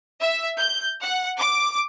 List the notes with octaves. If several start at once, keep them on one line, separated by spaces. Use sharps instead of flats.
E5
G6
F#5
D6